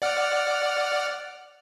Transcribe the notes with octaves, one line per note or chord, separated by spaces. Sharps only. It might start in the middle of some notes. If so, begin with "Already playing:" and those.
D5 F#5 F6